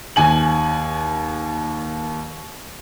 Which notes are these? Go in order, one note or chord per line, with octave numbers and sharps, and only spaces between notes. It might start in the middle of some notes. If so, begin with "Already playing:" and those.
D#2 G#5 F#7